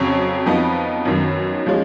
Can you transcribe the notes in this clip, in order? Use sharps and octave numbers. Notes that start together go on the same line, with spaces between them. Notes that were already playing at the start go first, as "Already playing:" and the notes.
Already playing: F2 C#3 F#3 C#4 C#5
F2 F3 B3 D#4
F#2 D#3 F#3 B3
F3 G#3 C#4